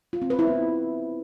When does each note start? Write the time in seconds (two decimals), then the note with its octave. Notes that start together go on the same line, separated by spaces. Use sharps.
0.13 F4
0.22 C4
0.30 B4
0.39 E4
0.47 B3